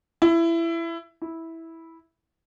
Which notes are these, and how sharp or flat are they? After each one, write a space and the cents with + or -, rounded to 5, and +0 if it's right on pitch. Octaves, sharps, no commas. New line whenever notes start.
E4 +20
E4 -10